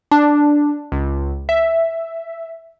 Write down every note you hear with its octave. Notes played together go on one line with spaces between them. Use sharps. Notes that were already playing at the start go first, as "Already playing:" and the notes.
D4
C#2
E5